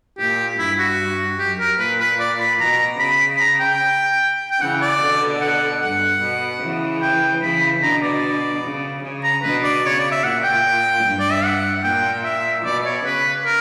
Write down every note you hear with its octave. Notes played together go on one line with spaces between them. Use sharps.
A#2 G4
G2 E4
F#4
F#2 G4
A#4
A#2 B4
B4
D5
B5
B2 A#5
C#3 B5
B5
A#5
G5
G5
C#3 E3 F#5
D5
B2 D3
F#5
G2 F#5
B2
C#3 E3
G5
C#3 E3 B5
B2 D3 A#5
D5
C#3
C#3
A#5
B2 D3 B4
D5
C#3 C#5
D5
E5
A#2 F#5
G5
G2
D5
E5
F#5
A#2 G5
E5
B2 D5
C#5
C#3 B4
A#4